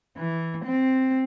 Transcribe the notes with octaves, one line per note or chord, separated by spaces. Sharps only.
E3
C4